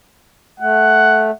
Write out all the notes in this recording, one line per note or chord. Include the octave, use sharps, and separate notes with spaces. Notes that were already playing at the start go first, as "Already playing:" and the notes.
A3 F#5